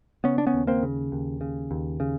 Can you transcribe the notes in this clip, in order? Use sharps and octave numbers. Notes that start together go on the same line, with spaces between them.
C#3 B3 C#4
D4
B3 C#4
D#2
A#3 C4
C#3
D#2
C#3
D#2
C#3